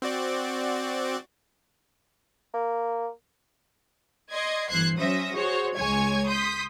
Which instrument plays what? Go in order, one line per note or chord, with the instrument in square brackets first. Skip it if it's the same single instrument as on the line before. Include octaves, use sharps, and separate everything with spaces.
[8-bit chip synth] C4 F#4 D5
[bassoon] A#3
[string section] D5 D#5 C6 G#6
G1 E3 C5 F#6 G#6 C7
F#3 C#4 C5 E5 D#6 A#6
F#4 G#4 C5 C#5
C#2 G#3 C#5 G#5 C#6 G#6
C6 D#6 G6 B6